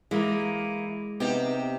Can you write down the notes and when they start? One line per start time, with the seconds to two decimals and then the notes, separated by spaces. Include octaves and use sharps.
0.11 E3 G#3 A#3 E4 A#4
1.20 C3 B3 D#4 G4 F5